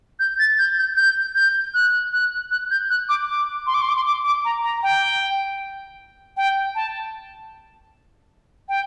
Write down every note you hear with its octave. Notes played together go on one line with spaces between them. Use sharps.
G6
A6
G6
G6
G6
G6
F#6
F#6
F#6
G6
F#6
D6
D6
C6
D6
C6
D6
C6
D6
D6
A#5
A#5
G5
G5
A5
G5